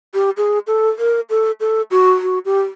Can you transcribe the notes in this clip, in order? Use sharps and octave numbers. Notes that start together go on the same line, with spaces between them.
G4
G#4
A4
A#4
A4
A4
F#4
F#4
G4